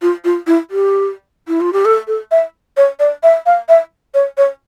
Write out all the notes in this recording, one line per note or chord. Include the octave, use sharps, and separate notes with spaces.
F4
F4
E4
G4
E4
F4
G4
A4
A4
E5
C#5
D5
E5
F5
E5
C#5
C#5